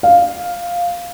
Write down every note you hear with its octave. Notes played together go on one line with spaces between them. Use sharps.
F5